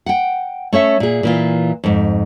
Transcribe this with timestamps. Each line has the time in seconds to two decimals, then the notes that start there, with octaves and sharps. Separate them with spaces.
0.06 F#5 G5
0.73 A3 C#4 C#5 E5
1.00 A#2 G#4
1.23 A#2 E3 F4
1.84 F2 G#2